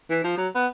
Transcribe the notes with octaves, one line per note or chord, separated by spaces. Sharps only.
E3
F3
F#3
B3